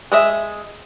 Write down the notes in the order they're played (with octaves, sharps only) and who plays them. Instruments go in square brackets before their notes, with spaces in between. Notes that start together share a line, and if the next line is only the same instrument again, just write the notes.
[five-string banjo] G#3 D#5 E5